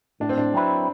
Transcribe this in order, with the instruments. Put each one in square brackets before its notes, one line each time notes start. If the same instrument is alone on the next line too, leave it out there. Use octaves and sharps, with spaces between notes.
[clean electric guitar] A2 [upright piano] D4
[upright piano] C4
D4
[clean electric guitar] F#3 C4 E4 B4